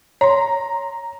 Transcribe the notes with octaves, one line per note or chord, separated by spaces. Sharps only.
C#5 A#5 C6